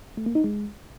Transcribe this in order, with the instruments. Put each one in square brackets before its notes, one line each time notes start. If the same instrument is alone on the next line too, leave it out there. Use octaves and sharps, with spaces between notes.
[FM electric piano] A3
A#3
D#4
G#3